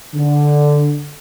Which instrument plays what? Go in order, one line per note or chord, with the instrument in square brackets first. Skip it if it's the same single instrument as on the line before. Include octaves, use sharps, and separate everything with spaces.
[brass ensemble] D3